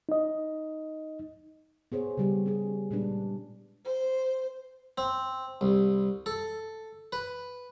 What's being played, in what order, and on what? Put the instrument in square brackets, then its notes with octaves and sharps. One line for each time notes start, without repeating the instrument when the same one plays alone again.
[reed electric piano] D#4 D#5
[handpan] B3 G#4 C5 C#5
C#3 G3 G4
C#4 G#4
A#2 G3 G#3 D4 B4
[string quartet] C5
[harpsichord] C4
C2
A4
B4